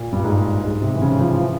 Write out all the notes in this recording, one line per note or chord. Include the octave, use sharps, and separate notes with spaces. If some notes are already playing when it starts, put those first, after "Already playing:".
Already playing: A#2
G2
G#2
G#2
C3
E3
C#3
F3
E3